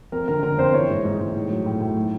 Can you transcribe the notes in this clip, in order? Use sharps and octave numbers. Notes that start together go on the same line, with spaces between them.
F2 A#4
D3 A#4
D3 A#4
F2 C5
E3 C#5
G#2
G#2
G#2
A2
F#3
A2
A2
F#3